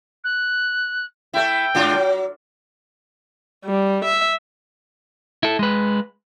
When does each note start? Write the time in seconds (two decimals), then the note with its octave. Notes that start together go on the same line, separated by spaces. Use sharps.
0.24 F#6
1.34 A3 E4 G5
1.75 G#2 D4 F4
1.93 F#3
3.65 G3
4.05 E5
5.43 E4 A4
5.59 G#3 B4